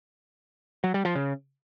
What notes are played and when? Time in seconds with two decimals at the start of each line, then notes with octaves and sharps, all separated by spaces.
0.84 F#3
0.94 G3
1.05 F3
1.15 C#3